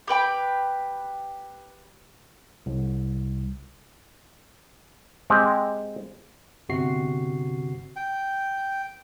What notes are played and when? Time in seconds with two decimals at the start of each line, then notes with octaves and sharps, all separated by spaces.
0.08 G4 B4 G5 B5
2.66 C2
5.30 G#3 C4 G4
6.69 G1 C3 F#4 C7
7.96 G5